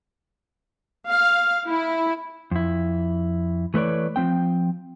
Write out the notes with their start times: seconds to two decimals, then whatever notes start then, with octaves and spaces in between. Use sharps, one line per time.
1.07 F5
1.66 E4
2.51 F2 E4
3.74 E3 A3 B4 C#5 D5
4.16 F3 C4 G5